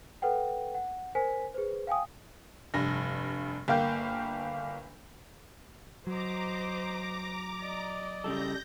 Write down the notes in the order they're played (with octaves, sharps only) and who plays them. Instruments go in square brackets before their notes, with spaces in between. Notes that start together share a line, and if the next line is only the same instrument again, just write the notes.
[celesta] A4 B4 F#5 G5
F#5
A#4 C5 G#5 B6
G#4 B4 C5
F5 G5 G#5 D#6
[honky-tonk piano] F1 G2 A#6
G1 A#3 F5 G5 G6
[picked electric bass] F#3 [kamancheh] C5 D#5 [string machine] A#5 D6
[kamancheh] D5 D#5
[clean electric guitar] C#3 G3 A4 [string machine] G6 A#6